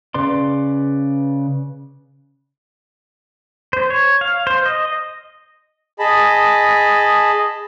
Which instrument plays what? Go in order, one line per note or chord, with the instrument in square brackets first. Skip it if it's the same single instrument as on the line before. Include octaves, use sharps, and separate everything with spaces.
[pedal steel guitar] C#3 B4 D5 C6
C5
C#5
F5
C5
D#5
[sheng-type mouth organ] G#4 D#5 A5 B5